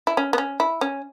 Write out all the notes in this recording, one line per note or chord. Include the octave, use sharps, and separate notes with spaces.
E4
C#4
B3
C#4
E4
C#4